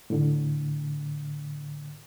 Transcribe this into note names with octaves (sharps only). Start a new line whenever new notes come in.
A2 D3